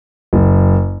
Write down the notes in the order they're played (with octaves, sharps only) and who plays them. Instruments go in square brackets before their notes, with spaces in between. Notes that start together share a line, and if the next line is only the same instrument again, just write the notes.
[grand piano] F#1